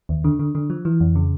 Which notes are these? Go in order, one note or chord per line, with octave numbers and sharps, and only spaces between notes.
D#2
D3
D3
D3
F3
E3
F2
C#3